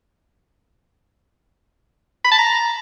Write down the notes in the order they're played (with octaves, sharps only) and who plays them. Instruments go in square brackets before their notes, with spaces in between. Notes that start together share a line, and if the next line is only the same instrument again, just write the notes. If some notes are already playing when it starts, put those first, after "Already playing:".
[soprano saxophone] B5
A5
A#5